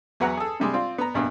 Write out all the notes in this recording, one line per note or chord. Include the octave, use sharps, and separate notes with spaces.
E2 F#3 B4 F#5 A#5 F#6
G#4 A4
C3 G3 G#3
C4 F4 D5
B3 A#5
A#1 G2 B2